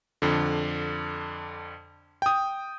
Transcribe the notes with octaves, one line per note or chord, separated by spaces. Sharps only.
F2 D3
G5 D#6